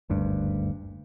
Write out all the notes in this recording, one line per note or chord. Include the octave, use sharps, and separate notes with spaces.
F#1 D2 G2